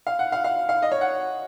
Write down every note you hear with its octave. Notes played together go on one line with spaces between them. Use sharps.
F5
F#5
F5
F5
F5
D#5
C#5
F#5